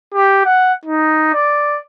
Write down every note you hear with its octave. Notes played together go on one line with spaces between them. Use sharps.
G4
F#5
D#4
D5